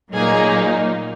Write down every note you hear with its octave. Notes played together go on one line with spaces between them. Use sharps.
A#2 F#3 A#3 D#4 G#4